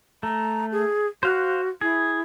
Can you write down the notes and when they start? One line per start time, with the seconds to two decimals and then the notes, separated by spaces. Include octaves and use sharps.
0.23 A3 A#5
0.72 G#4
1.23 F#4 C5 F5 F#6
1.81 E4 G#4